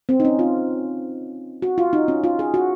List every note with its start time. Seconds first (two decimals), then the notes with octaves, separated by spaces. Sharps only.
0.09 C4
0.20 D#4
0.25 C#4
0.39 F4
1.62 F#4
1.78 F4
1.93 D#4
2.08 C#4
2.24 F4
2.39 G#4
2.54 F#4